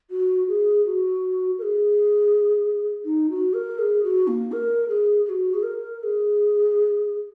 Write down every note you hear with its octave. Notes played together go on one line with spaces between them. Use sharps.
F#4
G#4
F#4
A#4
G#4
D#4
F#4
A#4
G#4
F#4
A#3
A#4
G#4
G#4
F#4
G#4
A#4
A#4
G#4